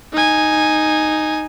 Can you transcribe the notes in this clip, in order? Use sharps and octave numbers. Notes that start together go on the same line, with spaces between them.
D#4 G#5